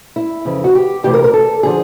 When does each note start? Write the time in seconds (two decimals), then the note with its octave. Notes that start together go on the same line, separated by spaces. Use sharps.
0.16 E4
0.45 F2 C#3 E3
0.64 F#4
0.75 G4
1.03 D2 C3 E3 G4
1.14 A#4
1.24 A#4
1.34 A4
1.63 D3 F3 G#4